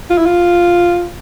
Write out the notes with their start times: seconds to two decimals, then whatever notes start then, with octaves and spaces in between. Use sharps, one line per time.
0.10 F4
0.18 E4
0.26 F4